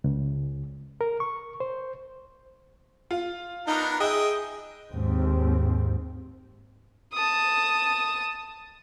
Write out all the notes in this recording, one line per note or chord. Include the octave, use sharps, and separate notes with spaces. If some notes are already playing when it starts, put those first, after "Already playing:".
C#2
A#4
C#6
C5
F4
B3 D4 D#4 A#4
G#4 D#5 E5 G5 D#6
D#2 G#2 C4
A5 D#6